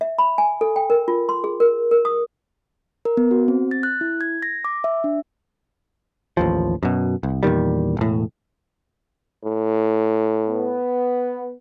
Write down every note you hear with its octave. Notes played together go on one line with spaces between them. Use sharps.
E5
B5
G#5
A4
G5
A#4
F4
C6
G#4
A#4
A#4
D#6
A#4
B3
F#4
C4
A6
F#6
E4
G#6
A#6
D6
E5
D4
A1 D#2 F3
F#2 B2
C2
E2 A#2 D#3 G3
E1 A2
A2
B3